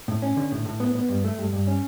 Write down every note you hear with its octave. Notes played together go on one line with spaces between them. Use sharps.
A2
C#4
D3
A2
A2
B3
B3
G2
A3
G2
G2
C#4